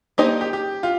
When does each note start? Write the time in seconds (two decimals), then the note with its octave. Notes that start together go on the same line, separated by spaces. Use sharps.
0.18 A#3 D#4 G4 C5 D#5
0.41 G4
0.53 G4
0.83 F4